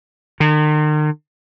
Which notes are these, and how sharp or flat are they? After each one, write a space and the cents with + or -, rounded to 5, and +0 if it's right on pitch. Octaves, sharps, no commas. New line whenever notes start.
D#3 -40